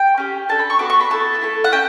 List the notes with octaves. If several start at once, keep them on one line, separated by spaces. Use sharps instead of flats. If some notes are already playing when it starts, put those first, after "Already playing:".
Already playing: G5
C#4 G4
D4 A4 A5
B5
C#6
B3 F#4 A4 D6
C#6
B5
B3 E4 A4 A5
A3 E4 A4
F#5
C#4 G5